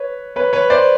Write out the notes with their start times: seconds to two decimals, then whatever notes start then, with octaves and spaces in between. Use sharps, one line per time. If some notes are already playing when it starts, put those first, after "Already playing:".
Already playing: B4 C#5
0.36 B4 C#5
0.53 B4 C#5
0.70 C5 D5